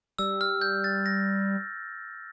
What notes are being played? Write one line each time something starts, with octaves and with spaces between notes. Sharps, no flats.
G3 E6
F6
G6
A6
A#6